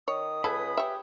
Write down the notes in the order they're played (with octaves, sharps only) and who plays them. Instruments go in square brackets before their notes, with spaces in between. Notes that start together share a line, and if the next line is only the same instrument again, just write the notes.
[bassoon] D#3 [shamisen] C#5 [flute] D#6
[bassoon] C#2 [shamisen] A4 [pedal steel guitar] B4 G#5 B5
[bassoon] G4 [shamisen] C#5 E5